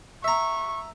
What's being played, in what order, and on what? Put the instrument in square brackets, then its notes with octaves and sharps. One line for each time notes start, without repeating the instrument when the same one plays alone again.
[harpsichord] E5 A#5 [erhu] C#6